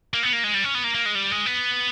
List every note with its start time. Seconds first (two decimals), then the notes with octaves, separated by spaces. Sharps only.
0.14 A#3
0.23 B3
0.33 A#3
0.44 G#3
0.54 G3
0.64 C#4
0.75 B3
0.84 A#3
0.95 A#3
1.06 G#3
1.15 G3
1.31 G#3
1.46 B3